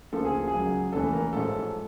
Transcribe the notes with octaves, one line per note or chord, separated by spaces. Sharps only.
D2 C#3 F3 A#3 A4
G#4
G#4
C#2 C#3 F#3
F1 D#2 C#3 E3 A4
A#4
A1 G#2 F3 A3 A4